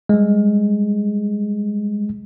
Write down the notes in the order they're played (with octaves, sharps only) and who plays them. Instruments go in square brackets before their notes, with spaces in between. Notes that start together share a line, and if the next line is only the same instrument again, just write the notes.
[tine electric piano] G3 G#3